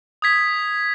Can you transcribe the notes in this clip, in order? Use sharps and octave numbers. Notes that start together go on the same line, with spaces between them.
D#6 G#6 B6